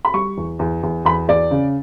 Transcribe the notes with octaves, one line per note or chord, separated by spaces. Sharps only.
B5
G3 C#6
E2
E2
E2
E2 B5
E2 D5
C#3